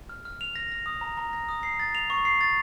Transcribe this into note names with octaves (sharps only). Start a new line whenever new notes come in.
F6
F6
F7
A#6
A#6
D#6
A#5
A#5
A#6
D#6
C7
A6
F7
C#6
C7
A6